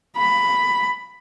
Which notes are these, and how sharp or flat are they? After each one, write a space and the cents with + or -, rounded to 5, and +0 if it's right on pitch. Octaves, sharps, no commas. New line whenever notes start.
B5 +10